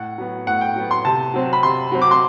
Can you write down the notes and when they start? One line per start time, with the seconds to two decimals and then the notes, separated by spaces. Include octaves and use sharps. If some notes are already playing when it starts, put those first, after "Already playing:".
Already playing: A2 F#5
0.18 F#3 B3
0.47 A2 F#5
0.61 G5
0.76 F#3 B3
0.91 C6
1.05 C3 A5
1.34 F#3 C4
1.53 B5
1.63 C3 C6
1.92 F#3 C4
2.02 D6
2.11 C6